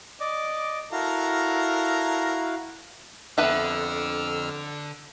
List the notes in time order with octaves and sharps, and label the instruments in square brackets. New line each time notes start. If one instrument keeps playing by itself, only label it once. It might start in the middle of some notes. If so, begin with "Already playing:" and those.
[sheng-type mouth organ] D5 D#5 D6
[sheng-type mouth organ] E4 F#4 F5 [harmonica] A4 A#4 A#5
[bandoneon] F2 E6 F6 [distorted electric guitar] D3 [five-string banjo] B3 B4 E5